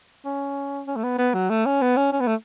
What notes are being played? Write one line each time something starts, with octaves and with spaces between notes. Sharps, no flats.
C#4
C#4
A3
B3
B3
F#3
A3
C#4
B3
C#4
C#4
B3
A3